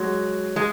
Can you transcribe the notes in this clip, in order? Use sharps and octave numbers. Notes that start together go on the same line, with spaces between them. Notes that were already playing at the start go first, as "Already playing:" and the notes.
Already playing: F#3 G#3
G#3